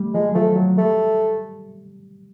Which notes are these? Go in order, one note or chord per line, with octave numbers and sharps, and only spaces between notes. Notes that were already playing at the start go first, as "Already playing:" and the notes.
Already playing: G3 A3
F3 G#3
F#3
F3 A3
F#3
G3 A3